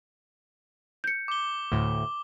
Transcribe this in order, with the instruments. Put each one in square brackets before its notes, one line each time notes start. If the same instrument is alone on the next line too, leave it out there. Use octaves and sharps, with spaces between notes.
[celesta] G6 C#7
[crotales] D6 G7
[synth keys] D2 A2